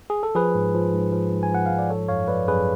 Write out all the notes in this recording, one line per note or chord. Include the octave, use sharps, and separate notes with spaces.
G#4
A4
F3 G#4 B4
G#2
F3
G#2
F3
G#2
G#5
F3 F#5
G#2 F5
D5
F3 A4 C#5
F#2 C#5 F5
F3 B4 D5
F#2 G#4 B4